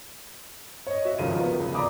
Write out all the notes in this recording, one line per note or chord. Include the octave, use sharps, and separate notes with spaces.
C#5 D#5
F#4 E5
G#1 C#2 D#3 F3 F4 D#7
B3
C#2
D5 A#5 B5 D6 D#6